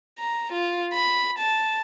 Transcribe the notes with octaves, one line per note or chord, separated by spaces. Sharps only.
A#5
F4
B5
A5